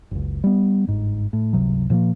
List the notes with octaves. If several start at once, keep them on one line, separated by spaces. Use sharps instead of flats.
F#1 C#2
G3 B3
G1 G#2
A2
G1 C#2 C3 F#3
A#2 F3 F#3 A#3